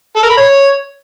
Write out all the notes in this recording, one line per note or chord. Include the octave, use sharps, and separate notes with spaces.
A4
A#4
B5
C#5